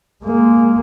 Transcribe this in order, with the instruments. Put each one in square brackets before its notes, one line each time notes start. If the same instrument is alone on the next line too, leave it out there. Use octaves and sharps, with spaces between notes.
[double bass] G#3 A#3